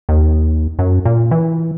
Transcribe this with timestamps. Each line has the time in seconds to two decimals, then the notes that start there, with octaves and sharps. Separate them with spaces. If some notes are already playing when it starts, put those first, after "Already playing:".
0.09 D#2
0.79 F#2
1.05 A#2
1.31 E3